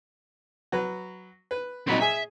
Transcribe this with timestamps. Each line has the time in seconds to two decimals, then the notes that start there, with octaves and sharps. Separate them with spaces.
0.72 F#3 B4
1.51 B4
1.87 A#2 F#3 C4 D#4 B5
2.01 G#4 E5 G#5